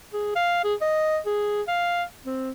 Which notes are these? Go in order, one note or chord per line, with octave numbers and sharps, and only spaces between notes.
G#4
F5
G#4
D#5
G#4
F5
C4